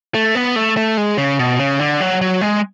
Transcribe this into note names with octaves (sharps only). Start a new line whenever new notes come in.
A3
B3
A3
A3
G#3
C#3
B2
C#3
D3
F#3
F#3
G#3